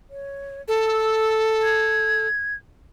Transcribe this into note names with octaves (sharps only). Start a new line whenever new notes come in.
C#5
A4
E6
G#6